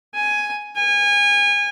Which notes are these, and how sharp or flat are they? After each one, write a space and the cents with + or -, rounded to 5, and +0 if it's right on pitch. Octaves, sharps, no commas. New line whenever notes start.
G#5 +5
G#5 -30